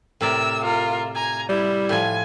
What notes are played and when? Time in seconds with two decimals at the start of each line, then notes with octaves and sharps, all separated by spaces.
0.21 A2 C3 A#4 D5 E6
0.63 F4 A#4
1.15 G#5 A#5
1.49 G3 E4
1.89 A2 F3 G#5